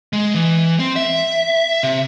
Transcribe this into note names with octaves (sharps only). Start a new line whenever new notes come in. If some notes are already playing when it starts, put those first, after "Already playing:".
G#3
E3
C4
E5
C3